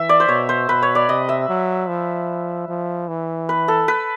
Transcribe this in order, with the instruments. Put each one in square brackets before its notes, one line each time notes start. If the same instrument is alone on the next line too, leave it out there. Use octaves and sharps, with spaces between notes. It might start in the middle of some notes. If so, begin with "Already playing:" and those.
Already playing: [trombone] E3 [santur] E5
[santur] D5
C5
[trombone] B2 [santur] C#5
[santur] C5
[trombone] B2 [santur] B4
[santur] C#5
D5
[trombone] C3 [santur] D#5
[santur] E5
[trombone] F#3
F3
F3
E3
[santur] B4
A4
B4